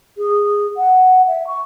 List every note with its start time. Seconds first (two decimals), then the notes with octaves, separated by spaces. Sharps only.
0.17 G#4
0.77 F#5
1.27 E5
1.47 C#6